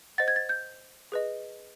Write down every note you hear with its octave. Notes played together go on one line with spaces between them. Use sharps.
C5 D#5 F#5 A6
G#6
A6
G6
G#4 B4 D#5